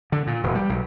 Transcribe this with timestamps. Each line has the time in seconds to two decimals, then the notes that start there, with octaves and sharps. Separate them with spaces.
0.12 D3
0.27 A#2
0.43 E1
0.55 G3
0.69 B1